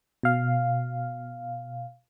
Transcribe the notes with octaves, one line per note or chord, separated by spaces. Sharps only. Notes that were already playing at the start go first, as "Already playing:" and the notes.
B2 F5